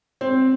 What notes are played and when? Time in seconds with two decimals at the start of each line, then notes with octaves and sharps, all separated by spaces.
0.21 C4